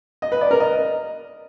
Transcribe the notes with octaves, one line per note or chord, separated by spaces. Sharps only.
D#5
B4
D5
A#4
D#5